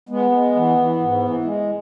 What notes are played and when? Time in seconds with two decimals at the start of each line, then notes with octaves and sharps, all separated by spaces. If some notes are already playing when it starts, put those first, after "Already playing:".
0.09 G#3 B3
0.31 G#3
0.55 E3
0.78 E3
1.00 G#2
1.22 E3
1.44 G#3